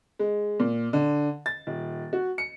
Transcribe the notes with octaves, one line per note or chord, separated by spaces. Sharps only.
G#3
A#2
D3
A6
D#1
F#4
C#7